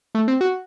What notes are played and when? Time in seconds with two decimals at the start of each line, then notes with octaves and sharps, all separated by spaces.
0.15 A3
0.28 C4
0.41 F#4